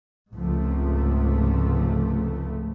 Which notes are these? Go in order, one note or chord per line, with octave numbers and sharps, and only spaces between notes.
C#2 G#2 C3 F3 A3